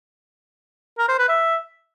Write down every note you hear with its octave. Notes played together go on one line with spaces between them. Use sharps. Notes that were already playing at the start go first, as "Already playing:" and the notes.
A#4
C5
B4
E5